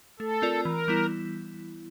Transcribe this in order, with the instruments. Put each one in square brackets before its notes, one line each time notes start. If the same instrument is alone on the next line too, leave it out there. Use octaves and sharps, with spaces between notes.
[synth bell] A3 [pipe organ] A4
[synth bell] C4 F4 A#4 D5
[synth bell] E3 [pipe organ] A#4
[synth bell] G3 B3 E4